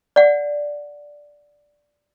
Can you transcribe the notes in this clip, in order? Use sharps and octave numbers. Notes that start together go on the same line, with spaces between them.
D5 F#5